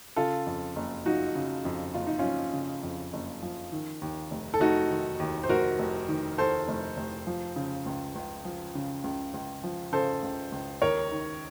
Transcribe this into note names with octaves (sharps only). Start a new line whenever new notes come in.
C#3 F4 A4
F2
F#1
F3 D#4 F#4
C#3
F2
F#1 F4
D#4
F3 C#4 F4
C#3
F2
F#1
F3
D#3
D#2
F1
A4
F1 D#4 F#4
D#3
D#2
C5
F1 F#4 A#4
F1
D#3
D#2 A4 C5
F1
F1
F3
C#3
C#2
C#2
F3
C#3
C#2
C#2
F3
C#3 A4 C5
C#2
C#2
D#2 A#4 C#5
D#3